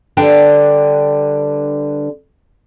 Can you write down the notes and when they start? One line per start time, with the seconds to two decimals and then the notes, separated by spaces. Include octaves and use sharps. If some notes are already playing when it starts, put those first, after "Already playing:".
0.17 D3 G3 D4 B4 G5